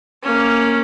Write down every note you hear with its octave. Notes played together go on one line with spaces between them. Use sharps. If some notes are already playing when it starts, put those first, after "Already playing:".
A#3 C#4